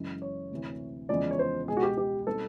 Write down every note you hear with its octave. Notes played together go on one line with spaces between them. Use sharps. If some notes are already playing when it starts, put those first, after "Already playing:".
Already playing: F#2 C#3 E3 G#3
C#5
D2 C3 E3
E2 C#3 F3 G#3 D5
C#5
C5
C#2 B2 G#3 G#4
F#4
G4
G4
B2 G3 C4 D#4 A4